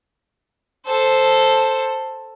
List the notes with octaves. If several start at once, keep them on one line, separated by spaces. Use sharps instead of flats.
A4 C5